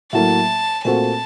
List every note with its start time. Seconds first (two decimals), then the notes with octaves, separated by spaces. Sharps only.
0.12 A2 F#3 A#3 A5
0.85 A#2 A3 C4 F#4 A5